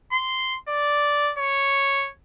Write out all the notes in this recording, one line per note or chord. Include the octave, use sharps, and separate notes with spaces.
C6
D5
C#5